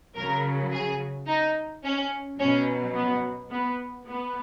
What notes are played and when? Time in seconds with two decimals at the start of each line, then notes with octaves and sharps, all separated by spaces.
0.16 C#3 F#3 A#4
0.72 G#4
1.27 D#4
1.84 C#4
2.39 B2 F#3 C#4
2.95 B3
3.51 B3
4.07 B3